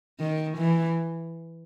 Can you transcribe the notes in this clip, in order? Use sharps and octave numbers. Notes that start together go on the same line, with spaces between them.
D#3
E3